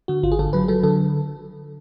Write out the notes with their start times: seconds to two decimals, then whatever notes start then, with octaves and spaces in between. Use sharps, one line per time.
0.08 D3 F#4
0.23 G#1 F4
0.32 G#4
0.39 D3 A4
0.53 F#3 B4
0.68 F#3 A4
0.83 D3 A4